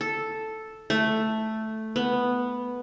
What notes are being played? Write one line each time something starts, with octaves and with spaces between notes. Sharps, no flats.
A4
A3
B3